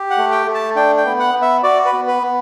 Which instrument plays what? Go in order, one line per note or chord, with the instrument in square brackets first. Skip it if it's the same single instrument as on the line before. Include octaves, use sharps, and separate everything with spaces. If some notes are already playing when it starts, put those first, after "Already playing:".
Already playing: [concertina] G4
F#5
A3
G5
A3
A5
D4 G5
G5
B3
F#5
B3
E5
F#4 D5
B4
B3
B4
B3